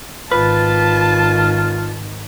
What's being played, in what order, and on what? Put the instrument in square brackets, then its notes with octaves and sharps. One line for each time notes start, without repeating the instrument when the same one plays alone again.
[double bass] G#1 D#3 [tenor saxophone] F4 [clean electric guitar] B4 [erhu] A5